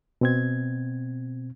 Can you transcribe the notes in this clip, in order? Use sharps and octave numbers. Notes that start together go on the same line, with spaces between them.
B2 C4 G#6